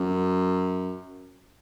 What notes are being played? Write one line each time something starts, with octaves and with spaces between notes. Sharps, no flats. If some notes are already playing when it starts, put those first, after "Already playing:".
Already playing: F#2